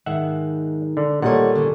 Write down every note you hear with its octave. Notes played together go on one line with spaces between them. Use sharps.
G#2 D#3 E5 F#5
D3
A#2 G3 A3 C#5 D#5 F#5
D3 C#4